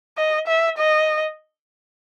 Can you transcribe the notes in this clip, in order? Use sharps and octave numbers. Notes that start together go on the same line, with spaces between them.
D#5
E5
D#5